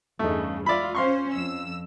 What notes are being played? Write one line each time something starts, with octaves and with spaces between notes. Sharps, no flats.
E2 G2 C#3 A3 D#4
G#3 F4 D5 E5 B5
C#4 C5 F5 C6 C#6
F2 E6